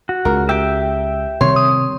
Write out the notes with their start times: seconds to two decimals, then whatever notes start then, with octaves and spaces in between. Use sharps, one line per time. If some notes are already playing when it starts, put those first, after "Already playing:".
0.09 F#4
0.25 C#2 C#3 A#4
0.49 G4 E5 G5
1.41 C3 D#3 G3 C#5 C6
1.56 D#6